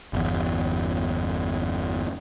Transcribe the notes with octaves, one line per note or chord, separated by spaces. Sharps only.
G1 E2